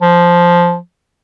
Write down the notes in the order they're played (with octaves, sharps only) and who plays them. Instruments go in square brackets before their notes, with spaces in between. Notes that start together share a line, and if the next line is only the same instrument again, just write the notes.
[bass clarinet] F3